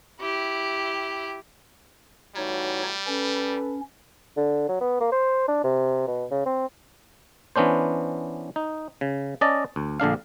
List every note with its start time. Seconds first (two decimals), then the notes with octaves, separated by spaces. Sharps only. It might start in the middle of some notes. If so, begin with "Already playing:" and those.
0.21 E4 G4
2.36 A2 E3 G3 D#4 F#4 C#5
3.07 C#4 A4 B4
4.37 D3
4.69 F#3
4.81 B3
5.01 A#3
5.12 C5
5.48 D4
5.64 C3
6.07 B2
6.31 C#3
6.46 C4
7.56 E3 B3 C#4 D4 C5
8.56 D#4
9.01 C#3
9.41 C#4 D5 D#5 A5
9.76 D2
10.00 A#1 D3 D4 F5